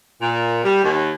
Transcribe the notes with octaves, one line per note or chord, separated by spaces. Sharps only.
A#2
G3
D#2